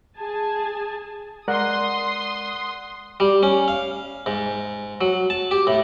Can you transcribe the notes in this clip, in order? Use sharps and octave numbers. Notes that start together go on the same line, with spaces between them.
G#4 G#5 A5
G#3 A#4 D5 F#5 C6 D#6
G3
C#4
F5
G#2
F#3
A5
G4
A2